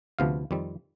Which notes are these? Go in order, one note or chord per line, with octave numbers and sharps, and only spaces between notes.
D2 C3 F3 B3 F5
F2 D#3 G3 C4